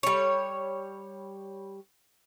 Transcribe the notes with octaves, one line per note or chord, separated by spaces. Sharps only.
G3 C#5